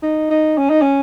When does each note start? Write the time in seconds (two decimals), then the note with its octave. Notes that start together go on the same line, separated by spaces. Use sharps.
0.03 D#4
0.30 D#4
0.58 C#4
0.70 D#4
0.82 C#4